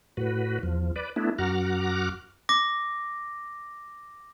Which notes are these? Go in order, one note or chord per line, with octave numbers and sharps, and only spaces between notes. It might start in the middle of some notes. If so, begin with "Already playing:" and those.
A2 F#4 B4
E2 F3
B4 D5
A3 B3 D4 E4
F#2 F#4 F#5 A#5 D6 F6
D6 A#6